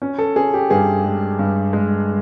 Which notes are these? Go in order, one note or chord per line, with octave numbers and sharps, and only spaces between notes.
C#4
A4
C#4 G#4
G4
G2 G#4
G#3
G2
G#3